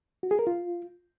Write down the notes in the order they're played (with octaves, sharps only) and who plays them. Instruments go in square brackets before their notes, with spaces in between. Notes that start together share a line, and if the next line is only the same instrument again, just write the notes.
[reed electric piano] F#4
G#4
A#4
F4